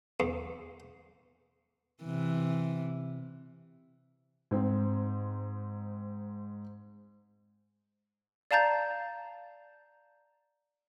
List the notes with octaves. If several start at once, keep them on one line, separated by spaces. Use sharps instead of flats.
E2
C3 E3
G#2 C4
D5 F5 A5 A#5 G6 A6